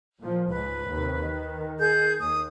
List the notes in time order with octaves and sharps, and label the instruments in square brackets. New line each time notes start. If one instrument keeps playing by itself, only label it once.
[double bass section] A#2 F3
[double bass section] C#2 G#2 [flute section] B4
[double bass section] D#2 C3
D#3
[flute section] G#4 G6
[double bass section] D#2 [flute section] D#6